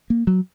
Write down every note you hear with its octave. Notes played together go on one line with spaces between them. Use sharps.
A#3
F#3